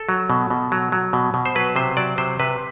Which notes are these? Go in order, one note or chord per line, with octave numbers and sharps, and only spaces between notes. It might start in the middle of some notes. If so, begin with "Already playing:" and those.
Already playing: A4
F#3
B2
B2
F#3
F#3
B2
B2
C5
F#3 B4
C3 C5
F#3 D5
C3 C5
C3 B4